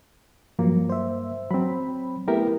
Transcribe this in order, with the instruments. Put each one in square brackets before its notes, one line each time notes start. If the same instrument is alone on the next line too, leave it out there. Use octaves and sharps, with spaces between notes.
[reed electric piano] G2 A#3 [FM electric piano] F3 F#3
[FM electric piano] C5 E5
[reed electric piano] F#3 C4 [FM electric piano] B5
[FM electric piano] A3 E4 [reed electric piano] B3 G4 A#4